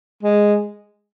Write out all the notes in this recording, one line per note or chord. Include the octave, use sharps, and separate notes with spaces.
G#3